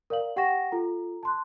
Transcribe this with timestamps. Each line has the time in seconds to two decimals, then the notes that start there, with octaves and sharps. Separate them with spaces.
0.10 A#4 D5 F5 F#7
0.36 G4 F#5 G5 C#6 A#6 E7
0.72 F4 A4 A#5
1.23 A5 C6 F#6